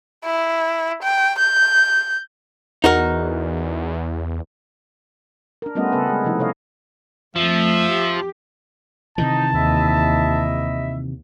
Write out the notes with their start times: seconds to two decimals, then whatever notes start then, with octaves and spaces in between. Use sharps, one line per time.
0.25 E4
1.03 G5
1.39 G6
2.84 E2 D#4 F#4 A#4
5.62 D4 A#4
5.75 G3 A3 B3 C#4 F4 D#5
5.92 C#3 B3 C4 A4 B4
6.07 G#3 G#4
6.24 C3 F3 A3 D#4 E4
6.39 C3 A4 C#5 D#5 F5
7.36 F2 F3 A3 E5
7.90 G4
9.18 C3 D#3 E3 D#4 A5
9.54 D#2 E4 D#5 E5